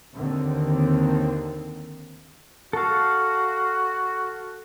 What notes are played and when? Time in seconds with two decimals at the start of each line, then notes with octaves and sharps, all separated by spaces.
0.15 D#2 D3 D#3 C4
2.73 F#4 A4 F5